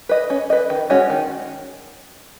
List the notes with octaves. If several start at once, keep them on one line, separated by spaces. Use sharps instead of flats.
B4 D#5
C#4
B4 D#5
D#3
G#3 C#4 F#4
D#3